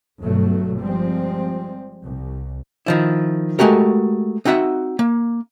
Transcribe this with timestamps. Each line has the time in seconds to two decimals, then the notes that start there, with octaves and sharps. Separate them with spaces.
0.19 G1 G2 B2 F#3 A3
0.79 F3 G3 G#3 C4
2.02 C2
2.86 D#3 F3 E4
3.59 G#3 A3 F#4 G4 A#4
4.45 C4 D#4 F#4 E5 F#5
4.99 A#3